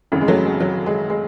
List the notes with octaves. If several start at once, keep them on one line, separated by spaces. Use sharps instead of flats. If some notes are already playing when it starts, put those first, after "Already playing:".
G#1 F#2 C#3 E3
G#3
F#3 A3
G#3
F#3
G#3
G#3